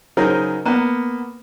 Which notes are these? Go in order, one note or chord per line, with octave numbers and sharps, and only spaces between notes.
C#3 F#3 D#4 G#4 A#4 C5
A#3 B3